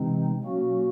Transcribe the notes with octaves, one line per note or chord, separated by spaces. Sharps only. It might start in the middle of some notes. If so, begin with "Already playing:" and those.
Already playing: C3 E3 G#3 C4 D#4
B2 F#3 A#3 C#4 F#4